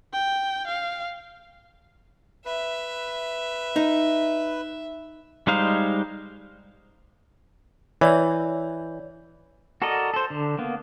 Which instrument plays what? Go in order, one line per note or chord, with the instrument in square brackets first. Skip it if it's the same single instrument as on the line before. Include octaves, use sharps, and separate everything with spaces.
[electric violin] G5
F5
[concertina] B4 [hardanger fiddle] E5
[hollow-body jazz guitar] D#4
[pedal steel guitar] G3 G#3 D#4 C5 F5
[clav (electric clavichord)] E3 [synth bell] C#5 D5 G6
[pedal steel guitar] F#4 A4 A#4 D5 D#5
A4 C5
D3
A#3 B3